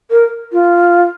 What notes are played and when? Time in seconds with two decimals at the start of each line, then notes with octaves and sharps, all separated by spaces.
0.11 A#4
0.52 F4